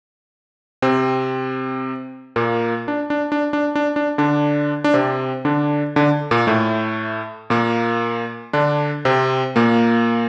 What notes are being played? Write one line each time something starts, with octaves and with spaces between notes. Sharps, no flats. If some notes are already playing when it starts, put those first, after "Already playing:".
C3 C4
A#2 A#3
D4
D4
D4
D4
D4
D4
D3 D4
D4
C3 C4
D3 D4
D3 D4
A#2 A#3
A2 A3
A#2 A#3
D3 D4
C3 C4
A#2 A#3